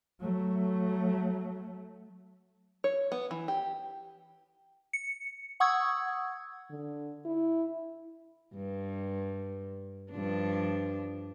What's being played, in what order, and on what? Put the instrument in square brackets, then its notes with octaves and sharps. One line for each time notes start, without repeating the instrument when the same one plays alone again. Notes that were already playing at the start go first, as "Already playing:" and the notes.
[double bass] F#3 A3
[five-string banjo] C#5
B3
E3
G4
[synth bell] C#7
F#5 C#6 D#6 E6 G#6
[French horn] D3
E4
[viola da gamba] G2
G2 F3 D4